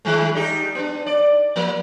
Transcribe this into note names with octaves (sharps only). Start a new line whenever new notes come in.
D#3 G#3 A3
G3 D#4 G4
B3 D4
D5
F3 A#3